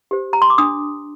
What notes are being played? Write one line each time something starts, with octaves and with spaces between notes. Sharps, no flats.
G4 C5
A#5
C6
D6
D4 D#6